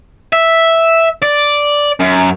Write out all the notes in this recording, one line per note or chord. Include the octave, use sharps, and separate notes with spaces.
E5
D5
F#2